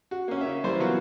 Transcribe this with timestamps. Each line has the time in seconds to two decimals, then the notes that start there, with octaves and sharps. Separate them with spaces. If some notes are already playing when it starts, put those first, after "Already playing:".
0.11 F#4
0.28 A#3 C#4
0.41 C#3 C#5 E5
0.64 E3 G3 A#3 C5
0.79 B2 E3 F#3 F4 F#4